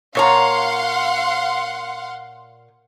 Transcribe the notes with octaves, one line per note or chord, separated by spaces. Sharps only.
A#2 C#5 F5 F#5 A#5 C6